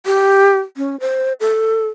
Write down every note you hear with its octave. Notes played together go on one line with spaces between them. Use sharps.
G4
C#4
C5
A4